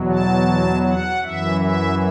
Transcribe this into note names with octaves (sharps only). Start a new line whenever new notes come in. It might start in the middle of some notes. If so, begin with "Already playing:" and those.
Already playing: E2 B2 F#3
A5
F#5
F#2 E3 E5
E5